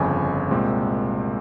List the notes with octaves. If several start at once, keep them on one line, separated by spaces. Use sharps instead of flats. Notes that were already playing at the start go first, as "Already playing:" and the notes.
Already playing: G1 F2 C#3 G#5
C2 A#2 G#3 C4